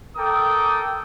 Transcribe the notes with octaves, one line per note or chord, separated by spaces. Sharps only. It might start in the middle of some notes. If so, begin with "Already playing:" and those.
A4 A#4 G5 D6 D#6